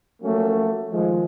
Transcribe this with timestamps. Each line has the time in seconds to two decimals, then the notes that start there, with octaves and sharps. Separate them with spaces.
0.22 F3 F#3 A3 A#3 C#4 F#4
0.92 D#3 F3 G#3